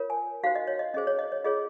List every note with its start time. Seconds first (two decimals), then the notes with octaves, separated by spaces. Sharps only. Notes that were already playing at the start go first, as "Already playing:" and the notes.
Already playing: F4 A#4 C#5
0.10 G#5
0.43 D#4 F#4 C5 F5
0.55 D#5
0.67 C#5
0.79 D#5
0.94 C#4 G#4 C5 D#5
1.07 C#5
1.19 D#5
1.32 C#5
1.44 F4 G#4 C#5 D#5